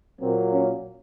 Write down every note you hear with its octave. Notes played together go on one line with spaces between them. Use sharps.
A#2 F#3 A#3 C4
C#4